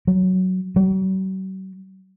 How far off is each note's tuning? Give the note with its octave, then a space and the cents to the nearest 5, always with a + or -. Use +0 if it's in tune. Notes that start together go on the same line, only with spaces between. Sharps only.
F#3 +5
F#3 +45